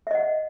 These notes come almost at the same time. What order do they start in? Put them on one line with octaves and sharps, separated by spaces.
E5 D#5 F#5